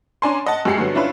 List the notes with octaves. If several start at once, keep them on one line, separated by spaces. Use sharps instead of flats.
C#4 D4 D5 G#5 A#5 C6
D#5 F#5 A5
F#2 G#3 G4 C7 C#7
G2 D3 F#3 B3
C#4 D4 E4 F4 B4